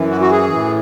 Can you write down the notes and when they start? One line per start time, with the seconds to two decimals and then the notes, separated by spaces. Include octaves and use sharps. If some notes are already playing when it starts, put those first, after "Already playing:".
Already playing: F#2 E3
0.11 F#4
0.21 F#4
0.31 G#4
0.50 A2 E3